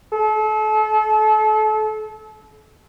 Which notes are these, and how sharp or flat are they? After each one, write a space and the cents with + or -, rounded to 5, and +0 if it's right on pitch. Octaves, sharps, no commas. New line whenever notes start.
A4 -35